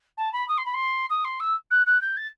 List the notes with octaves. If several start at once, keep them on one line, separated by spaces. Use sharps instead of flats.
A5
B5
D#6
C6
B5
C6
D#6
C6
E6
F#6
F#6
G6
A6